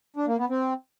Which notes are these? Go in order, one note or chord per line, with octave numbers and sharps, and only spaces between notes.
D4
A#3
B3
C4